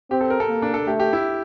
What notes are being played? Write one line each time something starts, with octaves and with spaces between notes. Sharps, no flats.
C4 G4
A4
A#4
A4
A#3
D4
A4
A3 G4
G4
E4